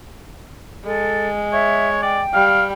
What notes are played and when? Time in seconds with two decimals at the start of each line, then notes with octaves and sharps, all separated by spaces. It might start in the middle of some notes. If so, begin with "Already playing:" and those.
0.85 G#3 A4
1.53 C#5 E5
2.03 D5 G5
2.34 G3 F5